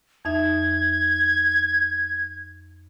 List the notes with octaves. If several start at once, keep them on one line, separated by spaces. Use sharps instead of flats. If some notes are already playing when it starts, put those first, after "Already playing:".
F2 D#4 E5 G#6